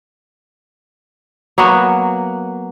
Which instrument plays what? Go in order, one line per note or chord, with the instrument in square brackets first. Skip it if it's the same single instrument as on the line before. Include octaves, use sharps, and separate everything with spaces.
[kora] F#3 A#3 B3 F#4